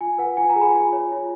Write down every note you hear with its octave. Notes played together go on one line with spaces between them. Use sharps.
F4 G#5
B4 F#5
F4 G#5
F#5 A#5
G#4
G#5 B5
F4
C#5
F4